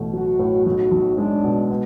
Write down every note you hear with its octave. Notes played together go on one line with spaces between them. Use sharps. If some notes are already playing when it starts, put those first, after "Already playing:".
Already playing: A1 B2 A3
F#3 F#4
A2
B1 F#4
B1
G#3 D4
B2
B3